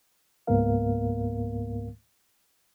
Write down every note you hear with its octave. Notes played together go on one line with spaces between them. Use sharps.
C#2 G#2 A#3 B3 A#4 F5